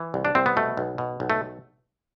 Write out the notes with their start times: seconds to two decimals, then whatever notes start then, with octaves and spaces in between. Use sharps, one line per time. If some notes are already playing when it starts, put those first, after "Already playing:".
Already playing: E3
0.14 C2
0.25 D4
0.35 C2 C4
0.46 B3
0.57 B2 A3
0.77 B1
0.98 B2
1.20 B1
1.30 A3